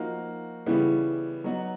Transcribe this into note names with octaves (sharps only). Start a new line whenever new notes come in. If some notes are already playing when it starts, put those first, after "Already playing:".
Already playing: F3 A#3 D#4 F#4
C#3 E3 G3 B3 E4
F#3 B3 D#4 F#4